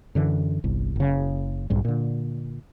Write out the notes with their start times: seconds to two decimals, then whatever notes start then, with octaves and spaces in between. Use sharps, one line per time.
0.15 F#2 D3 E3
0.64 G1 C2
0.96 F#1 C#3
1.70 B1 G#2 G3
1.85 A#2 D3